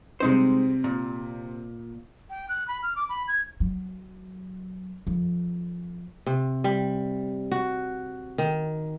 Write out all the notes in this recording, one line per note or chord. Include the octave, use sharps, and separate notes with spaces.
C3 G3 G#3 C4 D#4 C5
A#2
G5
F#6
B5
F6
D6
B5
G#6
F#3
F2
C3
G3
F#4
D#3